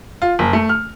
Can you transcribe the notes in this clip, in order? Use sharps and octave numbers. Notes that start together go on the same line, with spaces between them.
F4
F#1
A3
F6